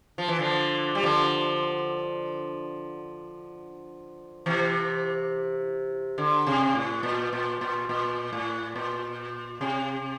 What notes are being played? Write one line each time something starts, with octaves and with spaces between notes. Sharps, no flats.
F3
E3
D3 F3
G3
D3 F3
C3 E3
D3
C3
A2
A#2
A#2
A#2
A#2
A2
A#2
C3